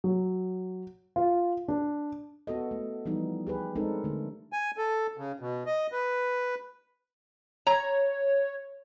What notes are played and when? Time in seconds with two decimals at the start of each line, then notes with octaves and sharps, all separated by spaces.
0.04 F#3
1.16 F4
1.68 D4
2.47 B3 F#4 A4 D#5
2.71 A3
3.06 E3 F3 G3 B3 D#4
3.47 G4 G#4 B4
3.75 G#3 C4 D4 D#4 A4 A#4
4.04 D3 A3
4.53 G#5
4.78 A4
5.18 C#3
5.40 B2
5.66 D#5
5.92 B4
7.67 C#5 A#5